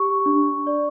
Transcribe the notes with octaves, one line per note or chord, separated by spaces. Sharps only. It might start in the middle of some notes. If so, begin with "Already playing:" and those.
Already playing: G4 C#6
D4
D5